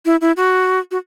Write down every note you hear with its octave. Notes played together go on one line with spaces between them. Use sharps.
E4
E4
F#4
F#4